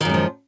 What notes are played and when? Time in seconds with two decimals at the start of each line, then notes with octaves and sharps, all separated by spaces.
0.01 D#3
0.05 F#2
0.09 G#3
0.14 F3